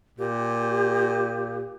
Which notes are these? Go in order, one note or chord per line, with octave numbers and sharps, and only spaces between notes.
A#2 G4